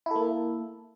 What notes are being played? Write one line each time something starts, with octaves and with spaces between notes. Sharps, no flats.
A#3 E4 A4